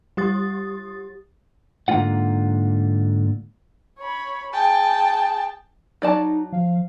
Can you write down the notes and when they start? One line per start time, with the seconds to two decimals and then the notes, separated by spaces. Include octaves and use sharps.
0.17 G3 G4 D#6 A6
1.88 G#2 D3 A#3 C#4 F4 F#5
3.99 C#5 B5
4.53 G#4 G5 A5
6.02 F#3 D#4 D5 A5
6.52 F3 F5